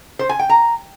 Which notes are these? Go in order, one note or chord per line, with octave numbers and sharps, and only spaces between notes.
C5
G#5
G5
A#5